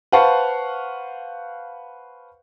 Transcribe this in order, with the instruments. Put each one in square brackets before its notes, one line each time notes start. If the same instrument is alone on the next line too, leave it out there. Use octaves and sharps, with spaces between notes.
[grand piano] B4 C5 F5 F#5 A5 C#6